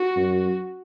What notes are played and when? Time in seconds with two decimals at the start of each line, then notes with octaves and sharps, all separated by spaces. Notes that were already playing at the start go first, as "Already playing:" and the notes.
Already playing: F#4
0.16 F#2